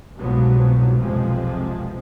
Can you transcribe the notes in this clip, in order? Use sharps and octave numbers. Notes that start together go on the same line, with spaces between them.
C2 G#2 B2 F3 F#3 B3
B1 F2 C3 F3 G#3